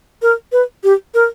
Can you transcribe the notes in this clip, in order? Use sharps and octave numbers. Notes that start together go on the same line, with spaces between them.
A#4
B4
G4
A#4